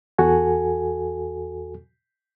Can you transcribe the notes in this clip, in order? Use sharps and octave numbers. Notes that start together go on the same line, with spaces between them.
E2 F#4 A4 G#5